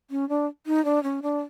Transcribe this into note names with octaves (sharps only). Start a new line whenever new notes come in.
C#4
D4
D#4
D4
C#4
D4